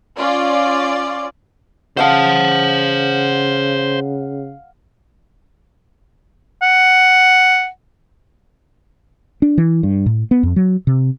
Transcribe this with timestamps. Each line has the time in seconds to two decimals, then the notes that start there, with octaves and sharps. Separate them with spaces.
0.16 C#4 F4 D5
1.97 C#3 C5 F5 F#5 A5
6.62 F#5
9.42 D4
9.58 E3
9.83 G2
10.06 A2
10.31 B3
10.43 F2
10.56 F#3
10.87 C3